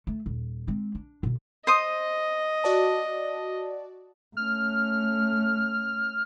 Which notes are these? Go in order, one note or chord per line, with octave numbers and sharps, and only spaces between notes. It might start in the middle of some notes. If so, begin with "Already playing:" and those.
A3
D#1
G#3 C4
D4
B2 D3
C5 D#5 D#6
F#4 D5 A5
A3 C#4 F6